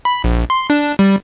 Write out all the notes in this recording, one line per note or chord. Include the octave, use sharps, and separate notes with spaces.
B5
A#1
C6
D4
G3